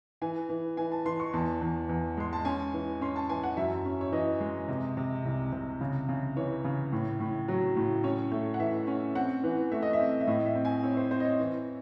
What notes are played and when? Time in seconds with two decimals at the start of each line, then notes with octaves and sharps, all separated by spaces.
0.22 E3 G#5
0.49 E3
0.77 E3 G#5
0.92 A5
1.06 E3 C6
1.20 C#6
1.33 E2 A5
1.61 E2
1.89 E2
2.17 G#3 C6
2.33 A5
2.45 C#4 G#5
2.73 E3
3.01 C#4 C6
3.16 A5
3.29 E3 G#5
3.43 F#5
3.57 F#2 E5
3.85 C#4
4.01 C#5
4.12 E3 D#5
4.40 G#3
4.68 C3
4.97 C3
5.25 C2
5.52 C3
5.81 C#3
6.08 C#3
6.36 E3 C#5
6.64 C#3
6.92 A2
7.20 A2
7.48 F#3
7.76 A2
8.04 C#4 C#5
8.32 A3 C#5
8.54 F#5
8.59 E3 E5
8.87 C#4
9.15 C4 F#5
9.43 E3
9.72 A3 E5
9.82 D#5
9.93 E5
9.99 C4
10.21 E5
10.27 A2 D#5
10.46 E5
10.55 C4
10.65 G#5
10.83 C4 C#5
10.97 C5
11.11 C4 C5
11.20 D#5
11.25 C#5
11.40 E3